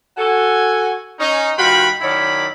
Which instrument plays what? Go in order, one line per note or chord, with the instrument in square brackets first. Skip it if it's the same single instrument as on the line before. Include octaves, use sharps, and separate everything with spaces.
[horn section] F#4 A4 G#5
C#4 D#4
G2 D#3 F4 F#4 G5 B5
F#2 D#3 E4 C#5 D5 B5